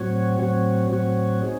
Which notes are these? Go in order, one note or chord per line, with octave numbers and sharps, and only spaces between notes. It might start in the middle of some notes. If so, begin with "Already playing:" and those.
Already playing: A2 F#3 C4 F#4 C#5
A2 F#3 C4 F#4 C#5
A2 F#3 C4 F#4 C#5
C4 D#4 G#4